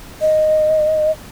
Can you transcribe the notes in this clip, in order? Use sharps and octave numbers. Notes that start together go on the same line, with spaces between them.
D#5